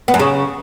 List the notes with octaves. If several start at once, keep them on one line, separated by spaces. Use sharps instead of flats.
B3
F#2
C#3